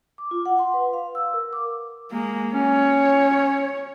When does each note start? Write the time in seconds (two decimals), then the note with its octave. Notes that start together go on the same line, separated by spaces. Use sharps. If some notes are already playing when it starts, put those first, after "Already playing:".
0.18 D6
0.31 F4
0.46 F#5
0.59 C6
0.74 B4
0.93 F5
1.15 E6
1.34 A#4
1.53 D6
2.12 G#3 A#3
2.54 C#4 C#5